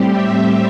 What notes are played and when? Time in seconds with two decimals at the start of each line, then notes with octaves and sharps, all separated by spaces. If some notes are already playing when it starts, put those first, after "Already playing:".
Already playing: A2 G3 C4 G4
0.10 E5